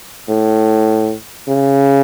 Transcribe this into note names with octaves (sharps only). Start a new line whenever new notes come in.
A2
C#3